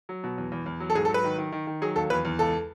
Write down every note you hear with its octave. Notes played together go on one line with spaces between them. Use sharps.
F#3
B2
E2
E2
E2
F#3
A4
G#2 G#4
A4
F#3
B4
D#3
D#3
D#3
D#3
F#3 G#4
D#2 A4
E2 B4
E2
C#2 A4